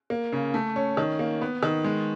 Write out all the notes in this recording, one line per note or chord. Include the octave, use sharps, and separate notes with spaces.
A#3
C#3
A3
C#4
D#3
A#3
B3
D#3
G#3